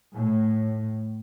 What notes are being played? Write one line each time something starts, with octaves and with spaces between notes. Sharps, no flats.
A2